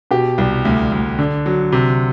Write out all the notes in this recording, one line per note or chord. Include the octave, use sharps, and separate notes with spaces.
B2 G4
C2
D2
D2
D3
F#3
C3